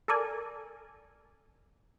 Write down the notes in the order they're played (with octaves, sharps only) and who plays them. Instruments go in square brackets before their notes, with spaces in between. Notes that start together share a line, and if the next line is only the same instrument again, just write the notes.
[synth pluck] A4 A#4 D5 G#5